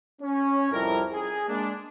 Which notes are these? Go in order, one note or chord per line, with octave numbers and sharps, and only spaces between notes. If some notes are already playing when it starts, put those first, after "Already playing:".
C#4
C2 F2 F3 G3 E4 A#4
G#4
G#3 A#3 D4